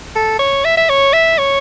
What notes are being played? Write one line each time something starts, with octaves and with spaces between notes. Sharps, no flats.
A4
C#5
E5
E5
C#5
E5
C#5